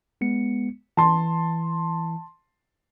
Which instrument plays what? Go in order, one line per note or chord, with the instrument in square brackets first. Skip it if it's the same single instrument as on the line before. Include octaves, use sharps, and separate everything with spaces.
[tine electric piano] G#3 B3 C#7
[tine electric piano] E3 [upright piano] A5 C6